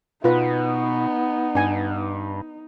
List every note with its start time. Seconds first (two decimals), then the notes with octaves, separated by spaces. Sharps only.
0.24 B2 B3 D#4 F4 B4
1.55 G2 D4 G#5